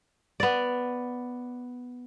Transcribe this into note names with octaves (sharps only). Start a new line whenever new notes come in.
B3 D5